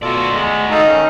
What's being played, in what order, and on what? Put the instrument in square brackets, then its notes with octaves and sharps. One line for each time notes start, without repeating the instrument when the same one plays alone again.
[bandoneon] B2 F4 A4 [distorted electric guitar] F#4 D5
[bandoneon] G#3
[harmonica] D#4 [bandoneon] A4 F5 A5
[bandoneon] D#3 C#4